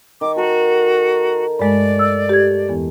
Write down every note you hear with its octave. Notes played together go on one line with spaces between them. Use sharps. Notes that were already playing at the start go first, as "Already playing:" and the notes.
D#3 C#6 D6
F#4 A4 A#4 C5
G2 G#3 A3 D5
E6
G4 G#6
E2 E3 B3